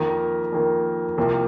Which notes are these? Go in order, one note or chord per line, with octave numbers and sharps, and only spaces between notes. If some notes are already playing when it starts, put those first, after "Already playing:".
Already playing: F2 D#3 A#3 A#4
F2 D#3 A#3
C2 C3 F3 A#3